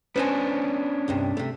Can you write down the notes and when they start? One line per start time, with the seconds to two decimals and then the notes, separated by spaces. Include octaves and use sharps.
0.16 B3 C#4 D4 B4 C5 G#5
1.08 C2 G2 C3
1.37 C3 A3